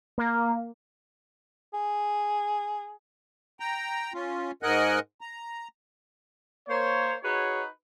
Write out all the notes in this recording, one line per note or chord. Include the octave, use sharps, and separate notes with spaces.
A#3
G#4
G5 A#5
C#4 F4
G#2 A#4 D#5 F#5 G#5 F#6
A#5
A#3 C5 C#5
D#4 F#4 G#4 B4 C#5